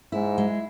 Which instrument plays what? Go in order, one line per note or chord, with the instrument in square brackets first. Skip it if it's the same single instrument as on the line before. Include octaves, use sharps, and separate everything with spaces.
[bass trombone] G#2 [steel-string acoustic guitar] E4
[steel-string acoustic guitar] G#3